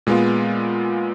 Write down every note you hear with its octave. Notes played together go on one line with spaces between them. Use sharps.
A#2 G#3 B3 F4